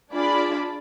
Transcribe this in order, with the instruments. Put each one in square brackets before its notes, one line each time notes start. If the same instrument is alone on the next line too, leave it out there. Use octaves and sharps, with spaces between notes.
[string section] D4 F4 G#4 D5 B5